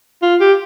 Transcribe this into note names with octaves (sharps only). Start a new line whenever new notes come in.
F4
G4